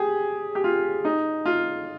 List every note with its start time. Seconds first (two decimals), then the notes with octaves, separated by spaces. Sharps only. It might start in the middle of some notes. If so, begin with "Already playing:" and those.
Already playing: G4 G#4
0.55 G4
0.64 F4
1.05 D#4
1.45 F4